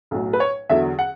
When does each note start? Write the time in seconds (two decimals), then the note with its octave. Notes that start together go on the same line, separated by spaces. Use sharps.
0.11 B1 A2 F#3
0.33 B4
0.40 C#5
0.69 E2 D3 F#3 E5
0.99 F#5